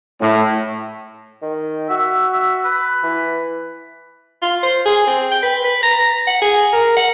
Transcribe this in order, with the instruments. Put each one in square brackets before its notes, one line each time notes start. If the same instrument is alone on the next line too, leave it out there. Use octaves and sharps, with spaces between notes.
[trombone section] A2
[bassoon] D#3
[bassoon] F#4 [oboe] E5
[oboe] E5
B4
[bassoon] E3
[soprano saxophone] F4
C5
G#4
C4
G5
B4
B4
A#5
F#5
G#4
A#4
F#5